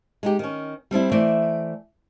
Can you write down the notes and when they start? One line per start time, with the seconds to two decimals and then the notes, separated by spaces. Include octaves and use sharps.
0.23 G#3 D#4 G4
0.39 D#3 C#4
0.91 G3 C4 D4 E4
1.12 E3 A3 C5 D5 E5